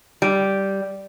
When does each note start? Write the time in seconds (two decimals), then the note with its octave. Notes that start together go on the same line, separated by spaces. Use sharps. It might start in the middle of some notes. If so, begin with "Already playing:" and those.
0.22 G3